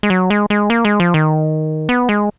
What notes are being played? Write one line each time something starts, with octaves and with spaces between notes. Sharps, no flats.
G#3
F#3
G#3
G#3
A#3
G#3
F3
D#3
B3
G#3